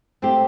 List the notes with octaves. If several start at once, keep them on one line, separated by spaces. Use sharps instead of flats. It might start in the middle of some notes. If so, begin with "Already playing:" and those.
A3 C4 G4